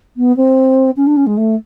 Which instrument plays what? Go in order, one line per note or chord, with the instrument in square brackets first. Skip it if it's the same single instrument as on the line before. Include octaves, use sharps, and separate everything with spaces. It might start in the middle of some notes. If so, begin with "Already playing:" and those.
[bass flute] B3
C4
C#4
D4
C#4
G#3
A3